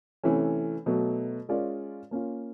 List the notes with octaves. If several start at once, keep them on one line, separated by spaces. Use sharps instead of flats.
C3 E3 A3 C#4
B2 F#3 A3
G#3 C#4 F4 A#4 D5
A#3 C#4 F4